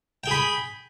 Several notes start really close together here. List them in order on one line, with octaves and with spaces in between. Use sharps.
G5 G#4 B5